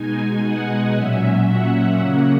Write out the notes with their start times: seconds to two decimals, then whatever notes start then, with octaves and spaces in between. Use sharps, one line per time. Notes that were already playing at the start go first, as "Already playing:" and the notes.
Already playing: B2 G#3 D#4 G#5
0.42 F#5
0.95 A#2 F#3 C#4 E5
1.47 F#5
1.99 C#3 F#3 A#3 C#4 F#5